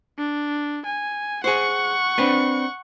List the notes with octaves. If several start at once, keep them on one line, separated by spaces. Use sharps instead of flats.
D4
G#5
G#4 C5 F#5 C#6
C4 D4 B4